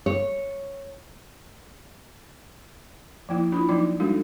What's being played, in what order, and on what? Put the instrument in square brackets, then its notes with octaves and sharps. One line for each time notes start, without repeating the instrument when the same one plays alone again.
[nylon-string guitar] C#5
[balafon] F3 A#3 E4
D4 E4 F4 B5
F3 F#3 A#3 D#4 D5 D6
G3 G#3 D4 D#4 F#4 A4